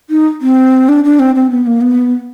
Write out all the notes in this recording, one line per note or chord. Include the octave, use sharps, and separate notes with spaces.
D#4
C4
D4
D4
C4
C4
B3
A#3
B3